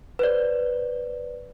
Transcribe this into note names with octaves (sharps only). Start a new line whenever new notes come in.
B4 C5 D5